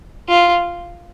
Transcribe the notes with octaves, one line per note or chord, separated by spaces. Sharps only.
F4